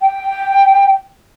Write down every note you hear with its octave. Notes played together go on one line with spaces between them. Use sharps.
G5